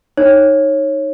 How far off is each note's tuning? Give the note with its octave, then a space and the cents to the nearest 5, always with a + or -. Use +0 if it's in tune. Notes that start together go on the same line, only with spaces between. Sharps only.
D#4 +0 C#5 -15